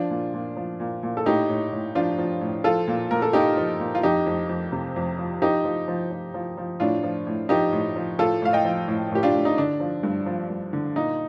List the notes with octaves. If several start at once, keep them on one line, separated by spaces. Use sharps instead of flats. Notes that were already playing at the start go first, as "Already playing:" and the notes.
Already playing: F3 D4 F4
A#2
A#2
F3
A#2
A#2
A4
A2 D#4 G4
A2
A2
F3 D4 F4
F3
A2
F3 F4 A4
A#2
A#2 A#4
A4
A#2 D#4 G4
F3
A#2
F4
F2 D#4 G4
F2
F2
C3
F2
F3
F3 D#4 G4
F3
F3
F3
F3
F3
A2 D4 F4
F3
A2
F3 D#4 G4
A2
F3
A2 F4 A4
A2 F5
D#5 G5
F3
A2
A2 G4
D4 F4
A2
D#4
D3 D4
F3
G2
F3
G2
D3
A#2 D#4